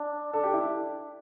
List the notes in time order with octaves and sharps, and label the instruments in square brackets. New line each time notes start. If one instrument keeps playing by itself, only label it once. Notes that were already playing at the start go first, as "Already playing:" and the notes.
Already playing: [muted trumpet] D4
[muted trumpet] D4 [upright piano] A4
[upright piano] G4
E4